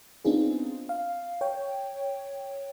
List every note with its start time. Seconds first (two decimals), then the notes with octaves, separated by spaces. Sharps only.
0.25 B3 C4 D4 D#4 F4 G#4
0.89 F5
1.41 C#5 G5